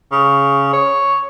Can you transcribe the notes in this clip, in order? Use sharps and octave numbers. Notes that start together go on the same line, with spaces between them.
C#3
C#5